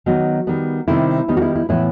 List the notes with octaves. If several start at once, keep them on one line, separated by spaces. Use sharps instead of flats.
D#3 F#3 B3 F#4
D#3 G3 B3
C3 D#3 G3 C4 E4
D#3 G3 B3 D#4
F#4
E4
E4
A2 E3 B3 E4